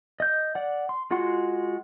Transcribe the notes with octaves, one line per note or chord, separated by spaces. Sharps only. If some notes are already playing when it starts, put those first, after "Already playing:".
D#5 G6
D5 F#5
C6
G#3 F4 F#4 F#5 C6